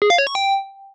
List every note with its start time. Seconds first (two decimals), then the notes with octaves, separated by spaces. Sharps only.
0.02 G#4
0.10 F5
0.18 C#5
0.27 C#6
0.35 G5